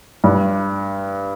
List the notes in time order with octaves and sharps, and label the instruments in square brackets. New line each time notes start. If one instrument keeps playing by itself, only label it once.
[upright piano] G2